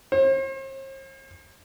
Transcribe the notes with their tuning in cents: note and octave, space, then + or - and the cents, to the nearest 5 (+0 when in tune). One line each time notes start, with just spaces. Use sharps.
C5 +45